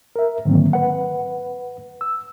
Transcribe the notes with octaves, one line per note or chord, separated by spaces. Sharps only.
A#4 E5
G#2 D3 D#3 F#3 A#3 C4
B4 F#5
E6